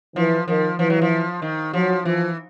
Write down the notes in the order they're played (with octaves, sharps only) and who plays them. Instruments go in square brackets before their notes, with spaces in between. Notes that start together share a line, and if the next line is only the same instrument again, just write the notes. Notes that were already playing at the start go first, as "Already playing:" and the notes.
[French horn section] E3 [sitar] F3
[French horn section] D#3 [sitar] F3
[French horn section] E3 [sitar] F3
[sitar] F#3
F3
D#3
[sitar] F3 [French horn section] F#3
[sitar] E3 [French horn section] F3